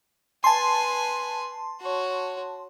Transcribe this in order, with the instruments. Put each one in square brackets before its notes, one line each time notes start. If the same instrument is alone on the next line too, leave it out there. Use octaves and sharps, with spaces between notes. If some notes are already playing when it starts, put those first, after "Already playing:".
[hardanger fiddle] B4 G#5 [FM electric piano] A5 C6
[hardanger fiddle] F#4 C#5